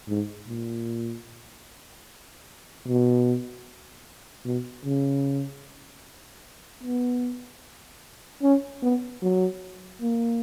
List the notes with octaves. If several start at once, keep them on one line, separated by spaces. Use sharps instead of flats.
G#2
A#2
B2
B2
C#3
B3
C#4
B3
F#3
A#3